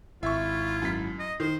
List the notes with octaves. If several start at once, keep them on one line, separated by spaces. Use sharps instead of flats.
G#1 E4 F4 E5 C#6
F#2 B6
D#5
D#3 C5